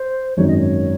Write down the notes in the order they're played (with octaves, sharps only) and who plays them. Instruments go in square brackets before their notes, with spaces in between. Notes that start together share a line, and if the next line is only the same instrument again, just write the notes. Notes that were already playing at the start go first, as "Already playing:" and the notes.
Already playing: [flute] C5
[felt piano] G#1 F#2 D#3 [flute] C#5
[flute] D#5
C#5